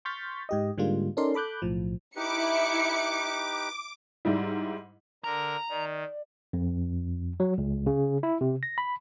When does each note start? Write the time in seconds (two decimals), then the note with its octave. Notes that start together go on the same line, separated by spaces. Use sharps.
0.05 C6 C#6 F6 G6 A6 B6
0.49 G#2 G4 D#5
0.78 G#2 D3 G3 G#3 A#3 F4
1.17 C#4 D#4 A4 A#4 D5 C6
1.34 A4 B5 D6 F#6 G6
1.62 B1 A2 F3
2.16 D#4 E4 G4 B4 D6 C#7
4.25 G#2 G3 E4
5.24 D3 A#4 A#5
5.69 D#3 D5
6.53 F2
7.40 F#3
7.58 C#2
7.86 C#3
8.23 E4
8.41 C3
8.63 A#6
8.78 B5